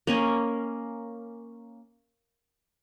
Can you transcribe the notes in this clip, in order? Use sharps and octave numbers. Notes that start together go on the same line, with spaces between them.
A#3 C#4 D#5 G#5